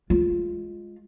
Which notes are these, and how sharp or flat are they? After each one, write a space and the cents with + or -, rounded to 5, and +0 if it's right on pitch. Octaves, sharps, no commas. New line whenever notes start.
G#3 +0 F4 +0